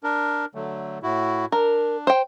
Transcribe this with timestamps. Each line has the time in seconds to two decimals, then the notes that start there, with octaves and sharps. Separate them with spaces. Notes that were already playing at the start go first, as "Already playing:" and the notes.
0.04 D4 A#4
0.55 D3 F#3 A3
1.03 A2 E4 F#4
1.52 D4 A#4
2.07 C5 G5